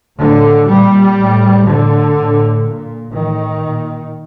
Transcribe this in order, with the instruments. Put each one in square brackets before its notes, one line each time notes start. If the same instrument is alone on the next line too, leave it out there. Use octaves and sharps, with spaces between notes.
[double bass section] A2 D3
A#2 G3
A2
A2 D3
A2
A#2
A2 D#3
A#2